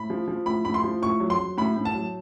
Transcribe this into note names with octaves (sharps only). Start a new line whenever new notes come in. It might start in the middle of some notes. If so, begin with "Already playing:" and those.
Already playing: A2 B5
F3
F3
A2 B5
A2 B5
C6
F3
A2 C#6
F#3
C6
F#3
A2 B5
A2
A5
F#3